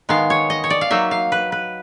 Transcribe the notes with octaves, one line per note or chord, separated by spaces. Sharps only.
D#3 G#3 B3 F5
C#5
D#5
C#5
D5
F5
F#3 A#3 D#4 E5
F5
B4
B4